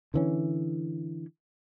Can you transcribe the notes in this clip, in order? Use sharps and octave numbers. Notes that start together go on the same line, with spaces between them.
D3 E3 C#4